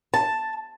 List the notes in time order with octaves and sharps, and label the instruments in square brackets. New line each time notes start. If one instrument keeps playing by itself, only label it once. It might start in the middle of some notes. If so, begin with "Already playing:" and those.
[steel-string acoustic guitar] A5